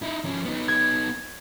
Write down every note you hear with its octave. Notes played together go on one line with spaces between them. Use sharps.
D#4 E4
F3 C#4
B3 D#4
G#6